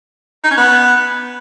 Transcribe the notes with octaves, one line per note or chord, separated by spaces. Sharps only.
D#4
C#4
B3